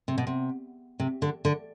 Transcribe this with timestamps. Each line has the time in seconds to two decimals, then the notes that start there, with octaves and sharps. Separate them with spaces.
0.08 C3
0.18 B2
0.27 C3
1.00 C3
1.22 D3
1.45 D3